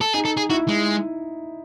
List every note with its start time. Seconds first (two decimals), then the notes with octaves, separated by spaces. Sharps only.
0.01 A4
0.13 D#4 G#4
0.25 A4
0.37 G#4
0.50 E4 F#4
0.68 G#3